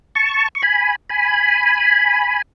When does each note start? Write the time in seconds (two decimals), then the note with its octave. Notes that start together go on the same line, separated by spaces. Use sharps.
0.15 A5 C#6
0.55 C#6
0.62 G#5 B5
1.09 G#5 B5